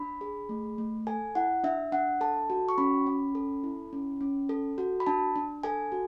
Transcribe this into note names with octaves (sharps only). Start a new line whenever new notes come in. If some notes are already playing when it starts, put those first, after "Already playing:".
Already playing: D4 B5
G#4
A3
A3
A4 G#5
E4 F#5
D4 E5
D4 F#5
A4 A5
F#4
C#6
C#4 B5
C#4
A4
E4
C#4
C#4
A4
F#4
B5
D4 A5
D4
A4 G#5
F#4